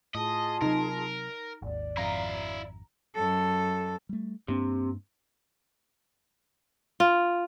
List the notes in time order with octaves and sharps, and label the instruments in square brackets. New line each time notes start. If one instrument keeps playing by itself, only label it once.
[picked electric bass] A2 [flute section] F4 G#4 A5 [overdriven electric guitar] D#5
[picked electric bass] C3 F#3 [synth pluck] D#4 [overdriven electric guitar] A#4
[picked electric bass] G#1 D#2 [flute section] D5
[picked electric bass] G#1 F2 [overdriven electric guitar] E4 F5 [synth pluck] A#5
[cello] F#2 A4
[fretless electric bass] G3 A3
[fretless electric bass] G2 A#3 D4 [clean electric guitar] C3
[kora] F4